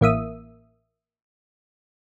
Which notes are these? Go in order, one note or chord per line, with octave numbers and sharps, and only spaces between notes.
A1 A#3 E5 D#6